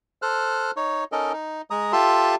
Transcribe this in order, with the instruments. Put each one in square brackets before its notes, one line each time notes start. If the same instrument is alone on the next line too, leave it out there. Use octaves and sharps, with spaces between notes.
[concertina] A4 C5 F6 F#6
D#4 C#5
C#4 D#4 A4 A#4 D#5
D#4
G#3 A#5 D#6
F4 G4 A4 E5 A5 C6